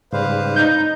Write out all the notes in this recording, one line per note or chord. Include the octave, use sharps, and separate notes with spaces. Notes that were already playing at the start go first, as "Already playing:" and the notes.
G#2 C#3 G3 B4 C5 F5
D#4 G6